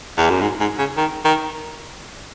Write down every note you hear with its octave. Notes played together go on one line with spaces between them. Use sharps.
E2
F#2
G#2
G#2
C#3
D#3
D#3